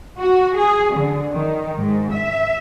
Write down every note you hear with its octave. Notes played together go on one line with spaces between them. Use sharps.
F#4
G#4
D3
D#3
G#2
E5